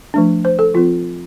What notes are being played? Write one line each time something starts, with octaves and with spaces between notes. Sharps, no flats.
F3 A3 D4
C5
A4
F3 C4 F4